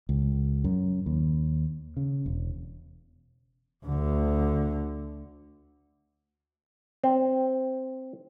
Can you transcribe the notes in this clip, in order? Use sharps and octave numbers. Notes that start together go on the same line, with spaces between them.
C#2
F#2
D#2
C#3
E1
D2 D3
C4